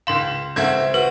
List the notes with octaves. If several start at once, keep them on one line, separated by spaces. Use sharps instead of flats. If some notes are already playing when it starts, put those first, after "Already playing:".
C#2 F5 C6 E7
C#2 C4 F#4 A4 E5 G#6
F#4 B4